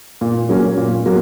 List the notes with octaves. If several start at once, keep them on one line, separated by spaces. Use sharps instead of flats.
A#2
F#3 A#3 C#4
A#2
F#3 A#3